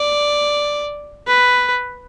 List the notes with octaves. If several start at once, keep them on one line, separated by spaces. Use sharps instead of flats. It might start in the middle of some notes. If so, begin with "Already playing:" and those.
Already playing: D5
B4